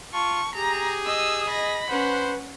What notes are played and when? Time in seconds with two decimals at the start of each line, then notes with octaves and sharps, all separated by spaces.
0.13 F4 A5 C#6
0.55 G4 G#4 A#5
1.06 D#5 D#6 E6
1.50 D#5 B5 A#6
1.90 C#4 B4 C5 F#5